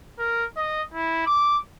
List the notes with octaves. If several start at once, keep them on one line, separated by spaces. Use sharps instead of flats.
A#4
D#5
E4
D6